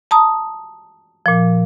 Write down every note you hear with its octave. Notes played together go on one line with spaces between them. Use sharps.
A5 A#5 D#6
A#2 F3